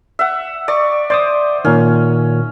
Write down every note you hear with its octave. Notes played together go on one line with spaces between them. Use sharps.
E5 F#5
D5 C#6
C5 D5 D6 D#6
A#2 D#3 C#4